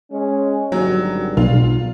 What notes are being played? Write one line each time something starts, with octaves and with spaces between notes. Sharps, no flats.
G#3 C#4
G#1 D3 F#3 G3
B1 F4